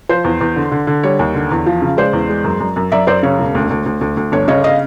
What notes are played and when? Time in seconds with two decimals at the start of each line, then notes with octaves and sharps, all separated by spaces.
0.09 F3 C5
0.24 E2
0.41 E2
0.56 D3
0.71 D3
0.87 D3
1.03 G3 C#5
1.19 D#2
1.35 D3
1.51 E2
1.66 F3
1.82 C#3
1.97 G#3 C5 D5
2.13 E2
2.29 G#3
2.44 F#2
2.60 F#2
2.76 F#2
2.92 F#2 D5 E5
3.07 F#2 C5 D5
3.23 C#3 C#5
3.38 E1
3.55 D2
3.70 D2
3.86 D2
4.01 D2
4.17 D2
4.32 G1 C#5
4.48 C#3 C#5 D#5
4.64 D#5 F5